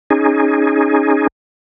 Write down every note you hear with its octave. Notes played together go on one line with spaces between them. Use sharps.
C#4 D#4 G#4